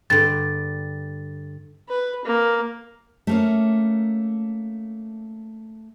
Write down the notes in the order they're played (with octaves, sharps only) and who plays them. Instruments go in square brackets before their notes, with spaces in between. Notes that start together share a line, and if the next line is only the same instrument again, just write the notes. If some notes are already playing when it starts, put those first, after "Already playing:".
[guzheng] G2 D3 [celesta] A6
[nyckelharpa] B4
A#3
[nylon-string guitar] A3 A#3 C#4